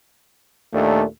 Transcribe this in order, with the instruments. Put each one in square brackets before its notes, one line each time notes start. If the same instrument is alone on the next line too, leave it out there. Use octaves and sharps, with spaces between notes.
[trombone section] D#2 A#2 D4 [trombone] A3